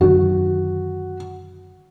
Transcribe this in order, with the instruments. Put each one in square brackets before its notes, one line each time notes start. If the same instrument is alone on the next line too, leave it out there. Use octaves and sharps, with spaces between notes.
[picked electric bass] F#2 D3 D#3 [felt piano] F#4